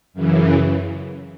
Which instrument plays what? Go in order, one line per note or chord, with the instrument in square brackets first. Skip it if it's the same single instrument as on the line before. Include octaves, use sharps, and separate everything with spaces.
[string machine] F#2 C#3 E3